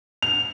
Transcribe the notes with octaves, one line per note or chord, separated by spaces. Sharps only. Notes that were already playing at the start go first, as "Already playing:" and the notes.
F7